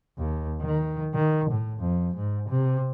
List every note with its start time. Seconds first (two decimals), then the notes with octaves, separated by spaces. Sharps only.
0.18 D#2
0.61 D#3
1.14 D#3
1.50 A2
1.80 F2
2.16 G#2
2.49 C3